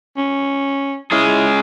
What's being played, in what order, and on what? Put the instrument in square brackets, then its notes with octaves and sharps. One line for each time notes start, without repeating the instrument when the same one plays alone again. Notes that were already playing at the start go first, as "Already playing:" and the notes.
[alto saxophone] C#4
[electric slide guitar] G#3 C#4 G#4 [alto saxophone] E4